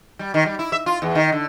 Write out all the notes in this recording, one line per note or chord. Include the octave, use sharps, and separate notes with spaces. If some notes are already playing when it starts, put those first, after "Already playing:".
G3
D#3
G3
E4
E5
F4
E2
D#3
D3